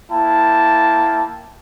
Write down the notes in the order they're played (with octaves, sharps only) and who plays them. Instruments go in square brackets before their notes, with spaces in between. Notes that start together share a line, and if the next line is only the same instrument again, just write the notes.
[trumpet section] A#3 E4 G5 A5